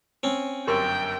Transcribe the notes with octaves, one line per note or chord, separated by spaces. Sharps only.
C4 C#4
G1 F#2 G4 A#4 G5 C6 E6